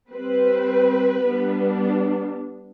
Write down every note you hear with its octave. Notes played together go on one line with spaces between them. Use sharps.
G3 C4 B4
G3 B3 D4